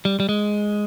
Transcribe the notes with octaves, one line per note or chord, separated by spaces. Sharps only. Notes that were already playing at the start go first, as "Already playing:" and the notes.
G3
G3
G#3